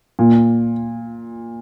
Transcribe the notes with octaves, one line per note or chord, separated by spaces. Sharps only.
A#2